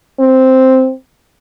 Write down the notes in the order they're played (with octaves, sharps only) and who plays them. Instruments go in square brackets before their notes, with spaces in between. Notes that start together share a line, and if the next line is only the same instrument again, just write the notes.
[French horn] C4